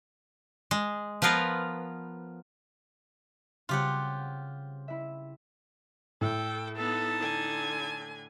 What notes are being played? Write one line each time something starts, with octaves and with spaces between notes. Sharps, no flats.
G#3
F3 B3 F4 A#4 B4
C#3 G3 C4 F4 G4 F#5
E4 E5
A2 A4 G5
B3 D#4 A4 A5
D3 G#5